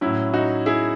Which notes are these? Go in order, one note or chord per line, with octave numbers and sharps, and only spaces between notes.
A2 F#3 C#4 E4
D#4 F#4
E4 G#4